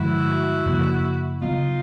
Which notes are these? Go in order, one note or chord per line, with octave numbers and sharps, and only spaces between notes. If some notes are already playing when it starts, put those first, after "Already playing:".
Already playing: G2 D3 F3 G#3 E4 F#4
F#2 C#3 F3 A#3
C#3 F#3 B3 D#4 F4